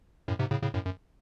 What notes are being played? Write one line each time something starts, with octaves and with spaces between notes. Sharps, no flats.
F#2 A2
G#2 C3
A2 C#3
A2 C#3
F#2 A2
F#2